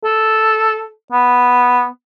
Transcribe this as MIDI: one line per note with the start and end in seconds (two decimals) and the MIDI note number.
0.04 0.88 69
1.12 1.86 59